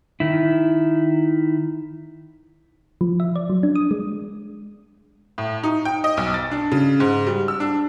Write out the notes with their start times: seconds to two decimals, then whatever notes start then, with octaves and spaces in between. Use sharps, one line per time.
0.20 D#3 E4
3.01 F3
3.20 E5
3.36 D5
3.49 F#3
3.63 D4
3.75 D#6
3.91 G#3
5.38 A2
5.63 D#4
5.85 G5
6.04 D#5
6.17 B1
6.34 A6
6.51 D4
6.72 C#3
7.00 G#2
7.27 G3
7.48 E6
7.60 D4